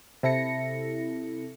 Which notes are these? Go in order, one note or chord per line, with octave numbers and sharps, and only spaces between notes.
C3 E4 A4 A#6 C#7